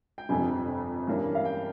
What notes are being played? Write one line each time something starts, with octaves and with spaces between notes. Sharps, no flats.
G5
G1 F2 C3 G#5
G2 E3 A#3 C#4
F5
G5